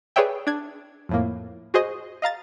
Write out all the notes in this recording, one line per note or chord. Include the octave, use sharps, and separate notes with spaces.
G#4 B4 C#5 D5 E5 G5
D4 G#6
F2 A2 A#3
F#4 G#4 C5 D#5
D#5 F5 A#5 A6